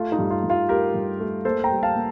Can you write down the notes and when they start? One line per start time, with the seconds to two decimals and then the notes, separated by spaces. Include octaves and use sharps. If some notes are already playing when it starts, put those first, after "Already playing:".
Already playing: A3 F4
0.12 D#4
0.19 G2
0.30 F4
0.44 G2
0.50 F4
0.69 A3 G4 A#4
0.94 G2
1.20 A3
1.45 A#3 A4 C5
1.64 G5 A#5
1.70 G3
1.83 F5 A5
1.96 A#3